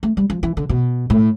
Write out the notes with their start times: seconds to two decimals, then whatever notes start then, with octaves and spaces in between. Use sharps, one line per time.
0.03 A3
0.17 G3
0.30 F3
0.43 E3
0.57 D3
0.69 B2
1.10 A2